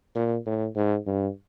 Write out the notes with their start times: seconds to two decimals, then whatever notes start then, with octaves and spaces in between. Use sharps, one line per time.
0.15 A#2
0.46 A2
0.76 G#2
1.07 G2